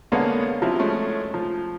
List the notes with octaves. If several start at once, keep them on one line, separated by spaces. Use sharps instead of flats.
D3 G#3 A#3 B3 C#4 A4
C3 F3 F#3 E4
G#3 A3 C#4
F3